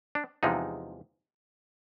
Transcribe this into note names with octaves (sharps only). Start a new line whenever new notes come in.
D4
E2 C3 F3 G#3 D#4